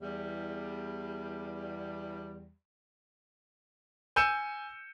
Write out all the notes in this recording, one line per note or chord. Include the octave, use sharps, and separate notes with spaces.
E2 G3
G#5 E6 G6 C#7 D#7 E7